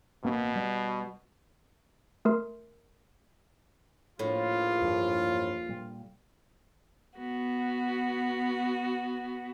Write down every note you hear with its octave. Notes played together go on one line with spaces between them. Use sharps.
A1 B2 A#3 C4
G3
A3 A#4 C6
A#1 A2 F4
E2 G2 F3
A#2 G3
B3 F#4